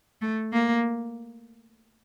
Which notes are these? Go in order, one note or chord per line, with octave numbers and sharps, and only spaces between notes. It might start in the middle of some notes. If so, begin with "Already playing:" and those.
A3
A#3